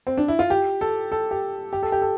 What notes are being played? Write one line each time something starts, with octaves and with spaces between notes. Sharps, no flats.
C4
D4
E4
F4
G4
A4
A4
G4
G4
A4
G4
A4